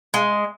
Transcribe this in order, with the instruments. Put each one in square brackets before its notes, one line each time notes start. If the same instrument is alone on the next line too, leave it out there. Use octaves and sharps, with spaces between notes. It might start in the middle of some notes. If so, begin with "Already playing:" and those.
[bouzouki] G#3